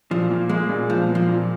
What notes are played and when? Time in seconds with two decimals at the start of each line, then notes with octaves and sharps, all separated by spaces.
0.11 A#2 F3
0.30 A#3
0.49 G#3 A#3
0.69 A#2
0.89 A#2 F3
1.09 A#3
1.15 F3
1.29 A#2